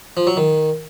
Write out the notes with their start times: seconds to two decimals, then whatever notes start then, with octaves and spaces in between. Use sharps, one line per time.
0.17 F3
0.27 F#3
0.37 D#3